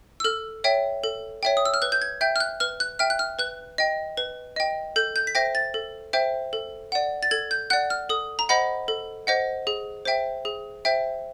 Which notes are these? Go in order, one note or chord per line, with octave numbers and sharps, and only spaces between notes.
E6
A4 F6
C#5 E5 G5
A4
C#5 E5 G5
D#6
E6
F6
B4 F#6
G6
G#6
E5 G5 G6
F6
F#6
B4 F6
F#6
E5 G5 F6
F#6
F6
B4 F#6
D#5 G5
B4
D#5 G5
A4 G6
G6
B6
C5 E5 G5 A#6
A6
A4
C5 E5 G5
A4
D5 F#5
A6
A4 G#6
G6
D5 F#5 F#6
F6
A4 D#6
A#5
C5 D#5 F#5 B5
A4
C5 D#5 F#5
G#4
C5 E5 G5
G#4
C5 E5 G5